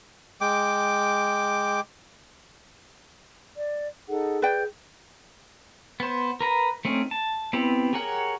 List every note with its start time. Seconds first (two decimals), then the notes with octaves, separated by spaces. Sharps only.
0.41 G#3 G5 D6
3.55 D5
4.09 D#4 G#4 A4 F#5
4.42 B4 D5 G5 G6
6.00 B3 C5
6.41 A#4 B4 A#5
6.85 A3 C4 C#4 D#4
7.11 A5
7.53 B3 C4 E4 G4
7.93 G4 G#4 A#4 C#5 F#5